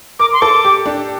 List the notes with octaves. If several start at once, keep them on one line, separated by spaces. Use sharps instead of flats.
A#4 D6
C6
A4 D6
G4
D4